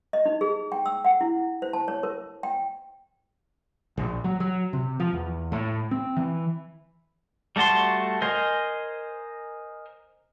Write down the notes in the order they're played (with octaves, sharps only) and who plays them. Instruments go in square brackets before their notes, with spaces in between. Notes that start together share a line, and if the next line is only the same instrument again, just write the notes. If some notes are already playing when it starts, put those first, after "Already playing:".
[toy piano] D#5
D#4
G#4
G5
E6
F#5
E4
C5
A5
C#5
A#4
G5
[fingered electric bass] A#1
F#3
F#3
C3
F3
E2
A2
C4
E3
[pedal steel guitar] G3 A3 F#4 A5 C6
A#4 C5 D#5 G#5